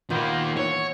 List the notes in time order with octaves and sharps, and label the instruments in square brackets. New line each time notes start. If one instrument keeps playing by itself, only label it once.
[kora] A#2 B3 G5 [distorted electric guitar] D#3 A#3
[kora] E3 F#5 [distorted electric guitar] C#5